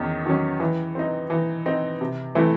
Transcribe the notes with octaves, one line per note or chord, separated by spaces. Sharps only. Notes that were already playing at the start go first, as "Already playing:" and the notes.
Already playing: E2 D#3 C#4
D#3 F#3 C#4
E3
C4 D#4
E3
C4 D#4
C3
E3 A3 C4 E4